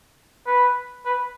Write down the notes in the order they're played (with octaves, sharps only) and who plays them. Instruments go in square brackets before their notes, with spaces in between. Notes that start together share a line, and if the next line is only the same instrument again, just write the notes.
[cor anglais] B4
B4